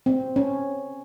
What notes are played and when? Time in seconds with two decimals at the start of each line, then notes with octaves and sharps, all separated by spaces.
0.06 C4
0.36 C#4